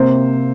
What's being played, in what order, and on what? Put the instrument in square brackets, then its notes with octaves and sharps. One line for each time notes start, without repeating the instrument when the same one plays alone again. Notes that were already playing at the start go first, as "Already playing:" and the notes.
Already playing: [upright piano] C3 A#3 C5